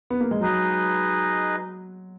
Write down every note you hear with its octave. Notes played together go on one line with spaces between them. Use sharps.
B3
A#3
G#3
F#3 D#4 G#4 B4 D#5